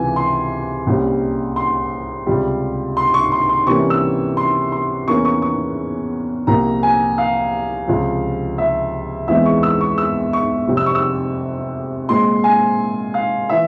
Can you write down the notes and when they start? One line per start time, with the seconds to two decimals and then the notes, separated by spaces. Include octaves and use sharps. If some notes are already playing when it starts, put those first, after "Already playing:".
Already playing: C#2 C3 E3 G#5
0.16 C6
0.86 C2 A#2 G3 C#4
1.56 C6
2.27 C#2 C3 G3
2.97 C6
3.14 C#6
3.32 C6
3.49 C6
3.66 C3 E3 G3 A#3 C#4 C#6
3.90 E6
4.37 C6
4.72 C6
5.07 E2 E3 A#3 C#4 C#6
5.25 C#6
5.42 C#6
6.47 C2 A#2 F3 A#3 A#5
6.83 G#5
7.18 F5
7.88 C#2 C3 F3
8.58 E5
9.28 E2 E3 G#3 C4 E5
9.46 C#6
9.63 E6
9.81 C#6
9.98 E6
10.33 C#6
10.68 F2 C3 G3
10.77 E6
10.86 C#6
10.95 E6
12.09 A#2 G#3 C4 C6
12.44 G#5
13.14 F5
13.49 E3 E5